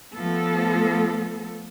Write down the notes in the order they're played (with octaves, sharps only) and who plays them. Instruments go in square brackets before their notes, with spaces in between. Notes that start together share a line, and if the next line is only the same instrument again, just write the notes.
[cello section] F3 A3 B3 A4